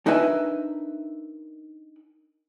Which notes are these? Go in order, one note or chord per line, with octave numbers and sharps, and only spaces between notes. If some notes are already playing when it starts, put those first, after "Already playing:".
D4 D#4 A#4 B4 E5 G#5